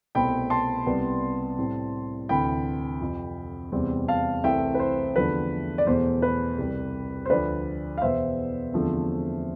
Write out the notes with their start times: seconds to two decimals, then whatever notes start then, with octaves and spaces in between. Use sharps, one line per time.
0.15 C2 B2 A3 C4 G5 B5
0.50 A5 C6
0.86 C2 C3 G3 B3
1.58 A2 G3 C4
2.29 D2 C3 E3 G5 B5
3.01 F2 C3 F3
3.72 E2 C3 G3 C4
4.08 F5 A5
4.44 C2 C3 E3 A3 C4 E5 G5
4.74 B4
4.80 C5
5.16 E2 D3 F3 A3 B4
5.78 D5
5.87 E2 B2 A3 C5
6.22 B4
6.58 C2 C3 G3
7.26 C5
7.30 D2 D3 F3 B4 D5
7.98 F5
8.01 E2 B2 B3 C5 E5
8.73 E2 D3 F3 A3 C4